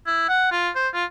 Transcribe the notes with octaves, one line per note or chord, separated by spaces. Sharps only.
E4
F#5
F4
C5
F4